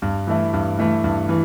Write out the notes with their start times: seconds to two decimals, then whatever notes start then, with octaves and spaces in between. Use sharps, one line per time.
0.02 G2
0.27 E3 A3 E4
0.53 G2
0.79 E3 A3 E4
1.04 G2
1.29 E3